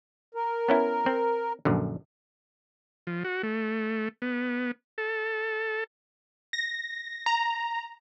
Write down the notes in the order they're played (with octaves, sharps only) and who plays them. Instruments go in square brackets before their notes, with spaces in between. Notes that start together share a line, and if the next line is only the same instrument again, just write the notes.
[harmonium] A#4
[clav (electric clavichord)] B3 C#4 E4
C4
A#1 F#2 D3
[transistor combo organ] F3
F#4
A3
B3
A4
[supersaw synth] A#6
A#5